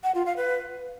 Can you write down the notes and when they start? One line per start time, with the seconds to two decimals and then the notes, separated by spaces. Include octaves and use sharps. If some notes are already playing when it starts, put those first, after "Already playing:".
0.04 F#5
0.15 F4
0.26 F5
0.37 B4